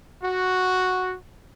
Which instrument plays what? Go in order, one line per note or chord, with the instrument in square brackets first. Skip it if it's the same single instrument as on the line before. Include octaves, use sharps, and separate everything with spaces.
[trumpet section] F#4